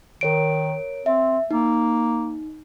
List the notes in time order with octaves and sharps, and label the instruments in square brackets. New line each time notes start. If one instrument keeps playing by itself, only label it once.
[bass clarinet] D#3 [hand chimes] A#4 C#5 D7
[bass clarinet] C4 [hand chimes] E5
[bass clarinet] A#3 [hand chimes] D#4